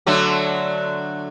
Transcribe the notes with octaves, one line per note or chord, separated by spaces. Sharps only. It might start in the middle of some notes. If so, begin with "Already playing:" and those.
D3 F#3 A3